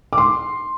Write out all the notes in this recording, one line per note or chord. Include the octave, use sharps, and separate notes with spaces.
D6
C6